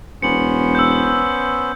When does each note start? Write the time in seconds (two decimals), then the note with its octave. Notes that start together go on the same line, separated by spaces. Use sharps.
0.22 E1 B3 C#4 C5 C#7 F#7
0.75 E6 G6